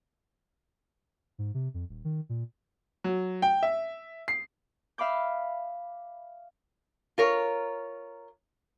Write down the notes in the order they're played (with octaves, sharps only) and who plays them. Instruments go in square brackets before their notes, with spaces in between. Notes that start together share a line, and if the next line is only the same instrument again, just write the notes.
[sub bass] G#2
C3
F2
D#1
D#3
A#2
[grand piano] F#3
G5
E5
C7
[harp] E5 F5 B5 D6 G6
[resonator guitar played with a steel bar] F4 A#4 C#5